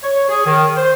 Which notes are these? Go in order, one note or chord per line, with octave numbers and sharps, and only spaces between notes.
C#5
G#4
D#3
C5